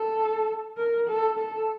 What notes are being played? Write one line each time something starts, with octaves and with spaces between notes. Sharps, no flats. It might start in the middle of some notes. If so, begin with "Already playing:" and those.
Already playing: A4
A#4
A4
A4